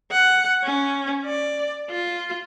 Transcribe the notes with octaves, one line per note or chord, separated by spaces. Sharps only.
F#5
C#4
D5
F4